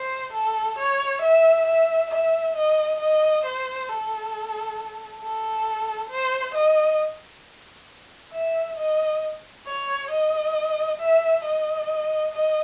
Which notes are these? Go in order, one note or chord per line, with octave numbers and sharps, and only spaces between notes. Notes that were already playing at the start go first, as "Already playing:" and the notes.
Already playing: C5
A4
C#5
E5
E5
E5
D#5
D#5
C5
A4
A4
C5
D#5
E5
D#5
C#5
D#5
E5
D#5
D#5